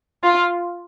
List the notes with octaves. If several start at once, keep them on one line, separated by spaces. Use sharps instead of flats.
F4